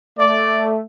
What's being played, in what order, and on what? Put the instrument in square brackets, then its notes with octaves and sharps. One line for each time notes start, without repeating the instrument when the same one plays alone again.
[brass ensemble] A3 [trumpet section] D5